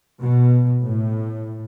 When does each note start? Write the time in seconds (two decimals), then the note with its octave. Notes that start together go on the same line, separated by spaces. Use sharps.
0.18 B2
0.83 A2